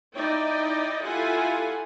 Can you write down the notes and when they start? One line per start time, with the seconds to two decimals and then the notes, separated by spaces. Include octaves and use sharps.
0.16 D#4 E4 D5 D#5 G5
1.04 E4 F4 G4 A4 F#5 G#5